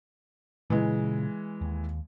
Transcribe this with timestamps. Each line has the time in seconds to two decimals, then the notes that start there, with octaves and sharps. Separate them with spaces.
0.70 A#2 C#3 E3 G#3
1.61 D#2